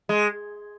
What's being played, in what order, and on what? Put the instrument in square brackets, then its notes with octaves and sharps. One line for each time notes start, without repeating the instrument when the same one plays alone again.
[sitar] G#3